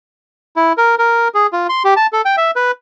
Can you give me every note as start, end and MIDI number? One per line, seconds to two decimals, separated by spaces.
0.56 0.73 64
0.77 0.95 70
0.99 1.28 70
1.35 1.47 68
1.53 1.67 65
1.69 1.83 84
1.85 1.94 67
1.97 2.07 81
2.13 2.22 69
2.25 2.36 79
2.37 2.51 76
2.56 2.71 71